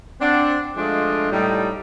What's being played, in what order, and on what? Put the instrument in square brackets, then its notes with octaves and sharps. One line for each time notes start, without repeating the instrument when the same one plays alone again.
[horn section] C4 D4 F#5
F3 G#3 A3 D4 F4 D#5
A2 G3 D#4